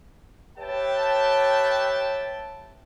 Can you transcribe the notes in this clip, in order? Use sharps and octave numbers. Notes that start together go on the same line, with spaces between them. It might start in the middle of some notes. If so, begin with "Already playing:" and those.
G4 B4 C#5 E5 G5 A5